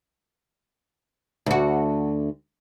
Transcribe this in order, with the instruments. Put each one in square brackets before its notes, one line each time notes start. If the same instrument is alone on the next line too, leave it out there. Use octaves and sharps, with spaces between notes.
[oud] D2 F#4